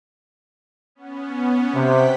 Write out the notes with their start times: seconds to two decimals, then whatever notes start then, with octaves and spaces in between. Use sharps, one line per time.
0.95 B3 C#4
1.74 C3 F#5 G5 B6